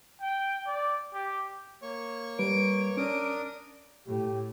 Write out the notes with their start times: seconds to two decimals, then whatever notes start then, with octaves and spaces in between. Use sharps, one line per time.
0.21 G5
0.67 D5
1.14 G4
1.82 A#3 C#5 C#6
2.39 G3 B4 D7
2.97 C#4 D4 A#4 D#6 D7
4.06 A2 G4